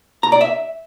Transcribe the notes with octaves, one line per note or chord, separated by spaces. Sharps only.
A#5
D5
E5